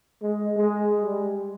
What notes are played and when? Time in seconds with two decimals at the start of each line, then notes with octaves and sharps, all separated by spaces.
0.22 G#3
0.56 G#3
1.02 G3